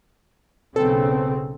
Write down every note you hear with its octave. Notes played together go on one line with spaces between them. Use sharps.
B1 C#3 C4 A4